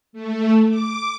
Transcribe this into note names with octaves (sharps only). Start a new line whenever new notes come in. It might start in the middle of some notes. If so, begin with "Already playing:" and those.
A3
D6